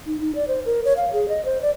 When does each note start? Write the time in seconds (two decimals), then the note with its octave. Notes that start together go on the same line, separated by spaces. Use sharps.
0.07 D#4
0.21 D#4
0.35 D5
0.48 C5
0.66 A#4
0.85 C#5
0.97 F5
1.13 G#4
1.29 D#5
1.45 C5
1.62 D5